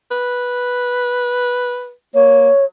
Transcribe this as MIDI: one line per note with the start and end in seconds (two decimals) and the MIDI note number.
0.11 1.92 71
2.15 2.50 58
2.15 2.65 73